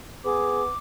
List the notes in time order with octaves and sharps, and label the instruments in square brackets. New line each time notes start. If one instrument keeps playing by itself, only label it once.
[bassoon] B3 [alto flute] G#4 [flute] D6